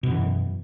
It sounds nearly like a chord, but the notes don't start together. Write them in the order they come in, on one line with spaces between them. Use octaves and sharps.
B2 F#2 E3